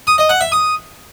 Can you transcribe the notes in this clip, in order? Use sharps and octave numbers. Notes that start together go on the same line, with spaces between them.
D#6
D#5
F#5
E5
D#6